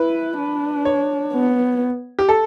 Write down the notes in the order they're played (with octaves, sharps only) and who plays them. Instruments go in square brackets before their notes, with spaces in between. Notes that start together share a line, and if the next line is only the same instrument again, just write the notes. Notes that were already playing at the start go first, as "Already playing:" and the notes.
Already playing: [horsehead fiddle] E4 [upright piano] B4
[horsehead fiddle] D4
[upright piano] C#5
[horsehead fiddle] B3
[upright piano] G4
A4